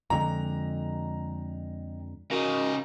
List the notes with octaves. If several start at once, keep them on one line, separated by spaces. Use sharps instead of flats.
F2 D3 F3 G#3 D#5 G5 A#5
C#3 D#4 F#4 A#4 A#6